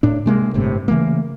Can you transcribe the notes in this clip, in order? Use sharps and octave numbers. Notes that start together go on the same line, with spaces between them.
A2 D4
C3 G#3 A#3
G1 A2 C3 C4
C#3 E3 A3 A#3